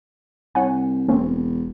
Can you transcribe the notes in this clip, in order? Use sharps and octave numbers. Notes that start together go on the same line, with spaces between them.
C2 C#5 F#5 G#5
E1 A#3 C4 C#4